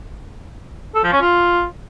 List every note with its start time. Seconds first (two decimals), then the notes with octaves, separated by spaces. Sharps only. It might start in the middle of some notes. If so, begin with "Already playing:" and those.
0.95 A4
1.04 F3
1.12 C#4
1.21 F4